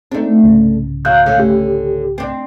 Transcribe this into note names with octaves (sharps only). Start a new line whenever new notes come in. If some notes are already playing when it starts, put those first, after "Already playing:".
A3 C4 D4 D#4
C2 G#2 C#3
F#3 F5 F#6 G6
D3 A3 C#4
G4
C4 D4